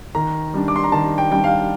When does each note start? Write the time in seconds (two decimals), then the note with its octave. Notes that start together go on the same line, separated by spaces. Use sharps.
0.15 D#3 A#5
0.54 G3 D4
0.68 D6
0.76 C6
0.84 A#5
0.92 D#3 A5
1.18 G5
1.31 G3 D4 G5
1.44 F5